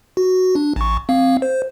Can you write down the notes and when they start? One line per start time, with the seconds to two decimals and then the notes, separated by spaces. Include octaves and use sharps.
0.17 F#4
0.55 D4
0.76 A1 C#6
1.09 C4 F5
1.42 C5